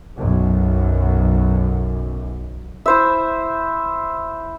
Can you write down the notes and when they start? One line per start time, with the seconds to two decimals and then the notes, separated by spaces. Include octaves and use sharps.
0.18 B1 F#2
2.86 E4 C5 E5